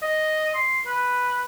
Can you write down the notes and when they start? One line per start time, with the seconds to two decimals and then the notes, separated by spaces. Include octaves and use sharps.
0.02 D#5
0.55 C6
0.86 B4